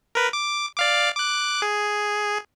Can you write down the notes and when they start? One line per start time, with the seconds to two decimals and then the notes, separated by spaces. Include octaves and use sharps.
0.15 A#4 B4
0.33 D6
0.77 D5 F5 D6
1.15 D6 F#6
1.62 G#4